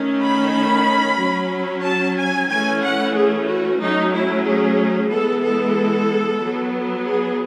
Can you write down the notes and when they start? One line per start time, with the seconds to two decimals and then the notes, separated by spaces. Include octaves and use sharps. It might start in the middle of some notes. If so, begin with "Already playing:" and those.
Already playing: D#3 A3 C#4
0.22 B5
1.19 F#3 C#4
1.84 A5
2.18 G#5
2.49 E3 A3 C#4 G#5
2.83 F#5
3.15 G#4
3.48 F#4
3.80 F#3 A3 C#4 D#4
4.13 E4
4.46 G#4
5.10 E3 G#3 B3 A4
5.44 A4
6.42 F#3 B3
7.07 G#4